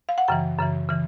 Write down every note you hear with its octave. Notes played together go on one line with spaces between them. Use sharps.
F5
F#5
F#2 C#3 E3 G5
F#2 C#3 E3
C#3 E3